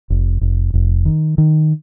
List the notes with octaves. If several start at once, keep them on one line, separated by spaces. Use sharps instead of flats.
F1
F1
F1
D#3
D#3